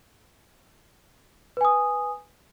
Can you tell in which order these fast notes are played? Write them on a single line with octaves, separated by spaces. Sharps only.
B4 G#5 D#6